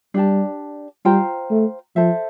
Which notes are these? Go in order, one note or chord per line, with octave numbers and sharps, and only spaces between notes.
G3 D4 G4 D5 A5
G3 F4 C5 G5 A#5
A3
F3 A4 C5 E5